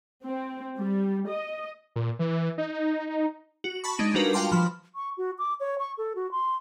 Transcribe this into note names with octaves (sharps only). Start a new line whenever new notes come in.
C4
G3
D#5
A#2
E3
D#4
F#4
A5 B5 C#6
G#3 D4 D#4
G3 F4 F#4 A#4 B4
F5 G5 A5 C6 D6
F3 B5
C#6
F#4
D6
C#5
C#6
A4
F#4
C6